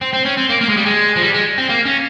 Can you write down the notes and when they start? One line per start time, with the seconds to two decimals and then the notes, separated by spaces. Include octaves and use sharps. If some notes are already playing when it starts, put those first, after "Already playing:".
0.01 C4
0.13 C4
0.26 C#4
0.38 C4
0.50 A#3
0.61 A#3
0.69 G#3
0.77 G3
0.86 G#3
1.16 F3
1.22 G3
1.34 G#3
1.58 C4
1.69 A#3
1.85 C#4